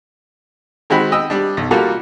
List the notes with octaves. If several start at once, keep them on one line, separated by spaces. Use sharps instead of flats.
D#3 G#3 C4 F#4 B5
D#5 G5 E6
G3 D4
B1
G3 A#3 F4 F#4 A4